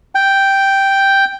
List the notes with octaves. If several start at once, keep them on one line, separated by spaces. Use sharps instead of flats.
G5